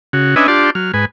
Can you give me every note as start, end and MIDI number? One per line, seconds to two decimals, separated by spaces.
0.13 0.35 49
0.13 0.35 66
0.36 0.47 61
0.36 0.47 62
0.36 0.47 71
0.36 0.47 75
0.36 0.47 76
0.36 0.47 80
0.48 0.70 62
0.48 0.70 65
0.48 0.70 67
0.48 0.70 74
0.48 0.70 81
0.48 0.70 84
0.75 0.92 54
0.75 0.92 89
0.94 1.05 44
0.94 1.05 71
0.94 1.05 80